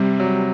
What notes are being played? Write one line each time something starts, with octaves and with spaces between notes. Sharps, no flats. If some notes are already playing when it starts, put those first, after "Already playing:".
Already playing: C3 G3
F#3